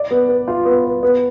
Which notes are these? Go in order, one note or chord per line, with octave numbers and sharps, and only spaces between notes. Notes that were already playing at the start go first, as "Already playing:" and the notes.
Already playing: D5
B3
B4
F4
B3
B4
B3